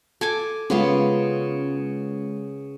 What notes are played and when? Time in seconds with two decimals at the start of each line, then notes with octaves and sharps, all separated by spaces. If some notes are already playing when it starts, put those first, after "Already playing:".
0.21 A4 G#5 D6
0.70 C#3 G#3 B3 C#4 F4